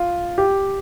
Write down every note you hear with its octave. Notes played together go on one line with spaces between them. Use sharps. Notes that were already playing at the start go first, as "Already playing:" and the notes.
Already playing: F4
G4